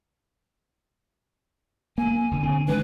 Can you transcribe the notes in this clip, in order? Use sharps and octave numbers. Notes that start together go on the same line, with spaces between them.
A#3 G#5
D#1 D3
D3 C4
D#3 G#3 D4 B4